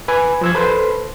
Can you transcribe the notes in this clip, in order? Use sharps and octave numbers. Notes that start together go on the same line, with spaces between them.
B4 G#5
F3 E6 G#6
A4 B4 C5